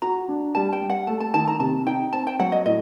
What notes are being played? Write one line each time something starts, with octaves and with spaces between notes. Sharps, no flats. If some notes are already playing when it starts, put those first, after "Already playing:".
F#4 A#5
D4
G3 A5
G5
G3
F#5
A3 A5
A5
D#3 A5
A#5
C3 A5
D#4 G5
C4 A5
G5
F#3 F#5
D#5
A2 D#5